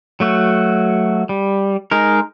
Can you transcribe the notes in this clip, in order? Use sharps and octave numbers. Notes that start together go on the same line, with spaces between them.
F#3 A3 F#4
G3
G#3 D#4 A#4